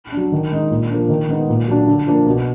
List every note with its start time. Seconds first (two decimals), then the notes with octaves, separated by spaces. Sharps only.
0.12 F#3 D4
0.32 D#3
0.52 G#3 D#4
0.71 A#2
0.90 F3 A#3 D4
1.09 D#3
1.28 G#3 B3 D#4
1.49 A#2
1.68 F#3 D4
1.87 D3
2.07 F3 A#3 D4
2.27 B2